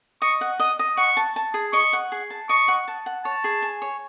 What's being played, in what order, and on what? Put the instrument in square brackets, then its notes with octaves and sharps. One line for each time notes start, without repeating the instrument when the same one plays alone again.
[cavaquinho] D#5 [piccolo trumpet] C#6
[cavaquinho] F#5
[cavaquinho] D#5 [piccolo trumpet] D#6
[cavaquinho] D#5
[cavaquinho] F#5 [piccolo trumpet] C#6
[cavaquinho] A5
A5
G#4
[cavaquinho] D#5 [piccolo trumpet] C#6
[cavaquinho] F#5
G#4
A5
[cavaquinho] D#5 [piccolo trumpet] C#6
[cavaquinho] F#5
A5
F#5
[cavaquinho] C#5 [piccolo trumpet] A5
[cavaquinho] G#4
G#5
C#5